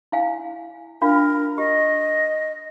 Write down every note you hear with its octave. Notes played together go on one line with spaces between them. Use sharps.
E4 F5 G#5
D4 F4 A#4 F5
G4 D#5